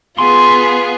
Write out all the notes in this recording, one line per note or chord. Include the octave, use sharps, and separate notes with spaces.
B3 F4 G#4 C6